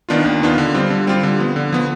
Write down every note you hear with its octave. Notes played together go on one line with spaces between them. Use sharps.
D#3 B3 D4 F4
D#2
D#3 B3 D4 F4
D3
G3 C4 F4
D3
G3 C4 F4
D3
F3 B3
D3
F3 B3